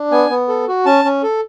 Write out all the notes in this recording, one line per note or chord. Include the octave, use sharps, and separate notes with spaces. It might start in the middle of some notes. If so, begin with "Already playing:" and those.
Already playing: D4
B3 G#5
B3
A4
F#4
C#4 A5
C#4
A4